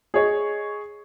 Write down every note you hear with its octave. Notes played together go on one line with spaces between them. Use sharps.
G#4 C#5 D#5